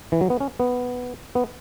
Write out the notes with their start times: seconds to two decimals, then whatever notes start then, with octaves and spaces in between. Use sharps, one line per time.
0.12 E3
0.21 F#3
0.30 B3
0.40 C#4
0.60 B3
1.35 B3